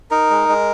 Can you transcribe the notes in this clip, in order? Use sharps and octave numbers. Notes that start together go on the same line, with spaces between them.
D#4 A#4
G#3
G#3